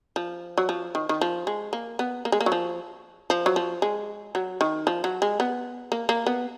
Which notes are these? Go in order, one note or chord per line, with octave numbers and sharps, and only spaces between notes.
F3
F#3
F3
D#3
D#3
F3
G#3
A#3
B3
A#3
G#3
A#3
F#3
F3
F3
F#3
F3
G#3
F#3
D#3
F3
F#3
G#3
B3
A#3
A#3
B3